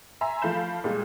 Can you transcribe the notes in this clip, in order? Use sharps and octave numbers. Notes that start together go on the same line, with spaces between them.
E5 G#5 A#5 C6
F3 A3 F5 B5 G6 E7
A#2 G3 G#3